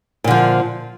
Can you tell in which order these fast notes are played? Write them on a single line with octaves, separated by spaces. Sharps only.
A#2 D3 F3